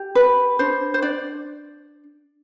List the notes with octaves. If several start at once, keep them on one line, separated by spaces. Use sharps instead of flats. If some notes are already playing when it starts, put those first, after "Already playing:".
Already playing: G4
B4
D4 C5
C5
D4 D5